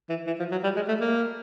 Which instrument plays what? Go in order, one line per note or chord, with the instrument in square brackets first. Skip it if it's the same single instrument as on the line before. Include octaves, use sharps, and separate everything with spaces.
[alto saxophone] E3
E3
F3
F#3
G3
G#3
A3
A#3